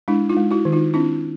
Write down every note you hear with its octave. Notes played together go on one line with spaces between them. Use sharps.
G#3 D4 E4
D#4 F4
G#3
E4 F#4
D#3
D#4 F4
C4 D4 E4